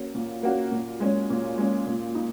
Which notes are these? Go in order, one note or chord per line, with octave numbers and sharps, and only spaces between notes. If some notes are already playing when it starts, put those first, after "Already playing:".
Already playing: A#3 C#4 F#4
A#2
A#3 C#4 F#4
A#2
G#3 C#4
A#2
G#3 C#4
A#2
D#4